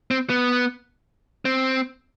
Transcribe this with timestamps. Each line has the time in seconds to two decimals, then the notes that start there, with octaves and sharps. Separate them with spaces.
0.11 C4
0.30 B3
1.45 C4